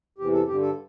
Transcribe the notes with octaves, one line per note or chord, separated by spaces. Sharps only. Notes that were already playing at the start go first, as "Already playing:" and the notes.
E2 C3 E3 G4
A4
G2 D3 G4
A4